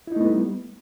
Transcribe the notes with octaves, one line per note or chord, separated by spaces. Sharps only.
G3 A3 B3 D#4 E4